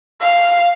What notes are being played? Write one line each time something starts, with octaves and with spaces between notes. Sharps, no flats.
F5